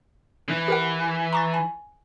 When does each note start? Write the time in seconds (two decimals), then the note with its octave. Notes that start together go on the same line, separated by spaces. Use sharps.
0.49 E3
0.68 G4 A#4 F#5
1.33 A#5 C#6 A6
1.54 G#5